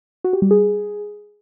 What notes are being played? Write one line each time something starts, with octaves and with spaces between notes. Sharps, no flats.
F#4
G4
G3
G#4